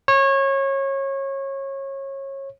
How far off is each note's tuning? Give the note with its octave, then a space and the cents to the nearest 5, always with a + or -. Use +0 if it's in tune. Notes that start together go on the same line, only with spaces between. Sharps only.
C#5 -25